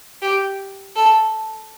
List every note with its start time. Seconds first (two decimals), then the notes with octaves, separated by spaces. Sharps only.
0.22 G4
0.96 A4